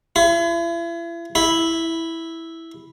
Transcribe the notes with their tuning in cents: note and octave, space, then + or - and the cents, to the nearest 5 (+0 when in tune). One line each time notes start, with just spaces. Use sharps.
E4 +40
E4 -5